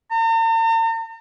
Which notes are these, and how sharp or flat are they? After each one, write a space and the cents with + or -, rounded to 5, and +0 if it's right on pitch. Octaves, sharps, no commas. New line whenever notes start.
A#5 -45